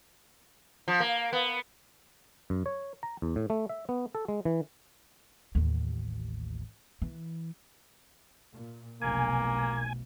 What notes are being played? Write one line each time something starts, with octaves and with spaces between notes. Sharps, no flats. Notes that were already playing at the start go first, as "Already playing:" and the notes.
F3
A#3
B3
F#2
C#5
A#5
E2
A2
A3
E5
B3
A4
G#3
E3
A1 D#2
E3
A#2
F1 B1 B2 A#3 G#5